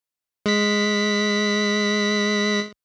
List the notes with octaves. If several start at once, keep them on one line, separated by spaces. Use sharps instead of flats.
G#3 B6